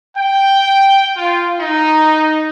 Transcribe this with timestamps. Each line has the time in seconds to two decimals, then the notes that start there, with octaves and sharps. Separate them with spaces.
0.17 G5
1.17 F4
1.60 D#4